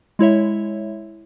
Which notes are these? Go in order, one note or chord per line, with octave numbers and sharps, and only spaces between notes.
G#3 E4 C#5 E5